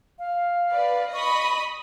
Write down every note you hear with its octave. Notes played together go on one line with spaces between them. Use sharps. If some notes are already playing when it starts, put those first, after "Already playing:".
F5
B4 D5
D#5 B5 C#6 D#6